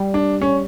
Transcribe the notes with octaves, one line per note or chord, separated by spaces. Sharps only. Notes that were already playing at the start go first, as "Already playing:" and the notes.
Already playing: G3
D4
C#4